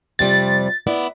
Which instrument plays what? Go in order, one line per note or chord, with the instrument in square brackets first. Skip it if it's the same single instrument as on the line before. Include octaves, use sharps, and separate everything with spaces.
[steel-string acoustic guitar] F2 C3 G3 [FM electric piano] A6
[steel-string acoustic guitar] B3 E4 D5